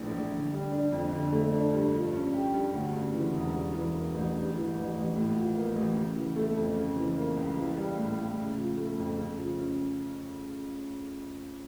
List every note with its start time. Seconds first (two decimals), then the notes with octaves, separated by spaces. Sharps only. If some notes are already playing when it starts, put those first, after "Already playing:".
Already playing: A#1 A2 E3
0.11 A#1
0.32 D3
0.52 G3
0.72 D4
0.92 F2
1.12 D3
1.32 A3
1.53 D4
1.73 G2
1.92 F3
2.13 C#4
2.33 G4
2.53 G2
2.73 D2
2.93 C#3
3.14 E3
3.34 E1
3.54 G2
3.74 E3
3.94 A#3
4.14 A1
4.34 G2
4.55 E3
4.75 A1
4.95 A1
5.16 A2
5.35 F3
5.55 A#3
5.76 A1
5.96 C#3
6.16 E3
6.36 A3
6.56 F2
6.77 C#3
6.96 E3
7.17 A#3
7.36 C#2
7.57 E3
7.77 G3
7.97 A2
8.17 A2
8.38 C#3
8.58 F3
8.77 A3
8.98 F2
9.18 C#3
9.38 F3
9.59 C#4